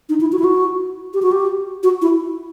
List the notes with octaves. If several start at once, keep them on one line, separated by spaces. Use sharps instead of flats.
D#4
E4
F#4
E4
F#4
G4
F#4
G4
F#4
E4